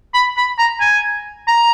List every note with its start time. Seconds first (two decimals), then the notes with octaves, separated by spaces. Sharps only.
0.14 B5
0.37 B5
0.59 A#5
0.80 G#5
1.48 A#5